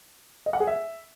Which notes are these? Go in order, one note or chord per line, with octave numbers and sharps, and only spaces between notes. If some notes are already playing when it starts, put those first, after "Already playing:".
D#5
F#5
G#4
E5